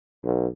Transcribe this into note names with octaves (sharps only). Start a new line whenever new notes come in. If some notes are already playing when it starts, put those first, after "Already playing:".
B1